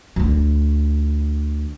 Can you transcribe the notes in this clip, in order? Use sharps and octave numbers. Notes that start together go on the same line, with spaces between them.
D2 D3